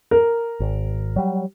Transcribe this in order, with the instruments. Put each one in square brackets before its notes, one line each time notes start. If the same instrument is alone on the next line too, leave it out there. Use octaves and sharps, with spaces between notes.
[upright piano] A#4
[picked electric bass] G#1
F#3 G3